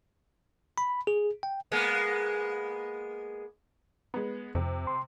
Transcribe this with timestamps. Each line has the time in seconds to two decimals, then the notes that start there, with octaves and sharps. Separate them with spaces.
0.78 B5
1.07 G#4
1.43 G5
1.72 G#3 A#3 B3
4.14 G#3 B3
4.55 F2 C3
4.87 C6